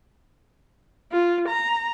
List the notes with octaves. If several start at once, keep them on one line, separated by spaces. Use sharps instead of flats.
F4
A#5